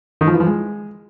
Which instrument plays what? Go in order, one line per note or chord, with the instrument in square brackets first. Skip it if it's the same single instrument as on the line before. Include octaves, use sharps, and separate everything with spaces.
[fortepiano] D#3
F3
E3
F3
G#3